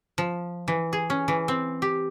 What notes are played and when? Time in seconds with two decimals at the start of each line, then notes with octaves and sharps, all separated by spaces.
0.18 F3
0.68 E3
0.93 G#4
1.10 C#4
1.28 E3
1.48 C4
1.82 G4